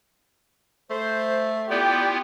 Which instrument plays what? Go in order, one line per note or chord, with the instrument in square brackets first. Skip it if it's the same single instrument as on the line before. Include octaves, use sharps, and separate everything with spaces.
[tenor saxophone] A3 [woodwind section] C5
[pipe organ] B3 E4 F4 [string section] G4 [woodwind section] D5 G5